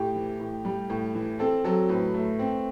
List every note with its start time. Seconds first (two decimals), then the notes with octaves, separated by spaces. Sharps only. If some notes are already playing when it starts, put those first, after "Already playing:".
Already playing: A2 G4
0.15 E3
0.40 A2
0.65 G3
0.90 A2
1.15 E3
1.39 C4 A4
1.64 F#3 A4
1.89 A2 B4
2.14 A3
2.39 C4